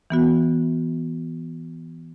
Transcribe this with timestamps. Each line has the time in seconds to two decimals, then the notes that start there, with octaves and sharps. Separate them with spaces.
0.10 E3 B3 F#4